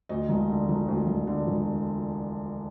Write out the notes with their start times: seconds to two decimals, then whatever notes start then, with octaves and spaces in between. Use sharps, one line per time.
0.09 D2 D#5
0.29 E1
0.50 D3
0.69 E1
0.88 D2
1.07 E1
1.27 D3
1.47 E1